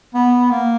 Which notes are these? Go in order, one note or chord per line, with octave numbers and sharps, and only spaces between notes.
B3
A#3